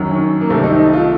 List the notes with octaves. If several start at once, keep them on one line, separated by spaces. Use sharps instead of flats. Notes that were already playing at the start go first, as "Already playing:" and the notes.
Already playing: F#2 D#3 F#3
C#4
A#3
C2 C3 D#3 A3 C4
D#4
D#4
F4